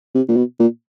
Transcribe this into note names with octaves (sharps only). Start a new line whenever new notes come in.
C3
A#2
B2
A#2